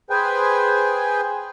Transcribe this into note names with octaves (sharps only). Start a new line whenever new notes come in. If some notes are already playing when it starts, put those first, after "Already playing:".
G#4 B4 C5 G5 G#5